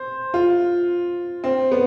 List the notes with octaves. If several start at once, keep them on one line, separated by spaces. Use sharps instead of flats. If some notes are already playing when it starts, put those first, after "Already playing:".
Already playing: C5
F4
C4
B3